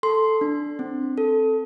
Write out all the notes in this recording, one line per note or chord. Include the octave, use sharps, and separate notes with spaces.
A4 C6
D4
C4
A4